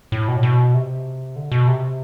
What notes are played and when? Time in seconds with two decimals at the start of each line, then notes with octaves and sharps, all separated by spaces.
0.12 A2
0.28 B2
0.37 A2
0.43 B2
0.74 C3
1.36 D3
1.52 B2
1.67 C3